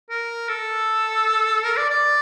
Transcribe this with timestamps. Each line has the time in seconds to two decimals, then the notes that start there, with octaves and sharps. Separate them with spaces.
0.10 A#4
0.49 A4
1.64 A#4
1.77 D5
1.90 D5